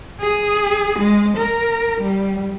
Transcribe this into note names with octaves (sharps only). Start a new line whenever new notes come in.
G#4
G#3
A#4
G3